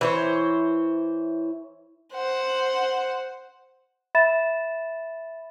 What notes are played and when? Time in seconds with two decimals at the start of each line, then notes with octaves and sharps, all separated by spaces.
0.01 E3 C5 C#5
2.14 C5 F#5
4.15 E5 B5 A6 E7